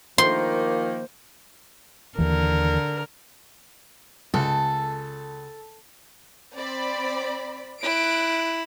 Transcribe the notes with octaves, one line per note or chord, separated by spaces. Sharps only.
D#3 F3 A#3 C5 C6
D#2 D3 E3 A#4
C#2 A4
C4 D5 B5
E4 F#6 D7